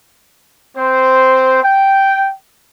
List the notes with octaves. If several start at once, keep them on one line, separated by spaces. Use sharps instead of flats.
C4 C5
G5